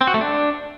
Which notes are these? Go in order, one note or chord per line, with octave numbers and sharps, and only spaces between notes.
C4
F#4
A3
D4